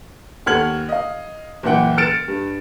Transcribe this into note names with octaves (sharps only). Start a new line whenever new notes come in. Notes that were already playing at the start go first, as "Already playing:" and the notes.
D#2 A4 F#5 F6 G#6 F#7
D#5 F5
F#1 A#2 E3 F#5 G5
F6 A6 C#7 D7 E7
G2